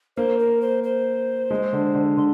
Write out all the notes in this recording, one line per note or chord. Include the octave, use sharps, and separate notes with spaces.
A#3 C5
A#4
C5
C5
G#3
D3
D3
D3 C6